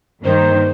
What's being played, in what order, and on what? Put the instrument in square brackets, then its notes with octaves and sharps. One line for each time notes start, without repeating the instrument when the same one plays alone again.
[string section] G2 D#3 A#3 D#4 [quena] C5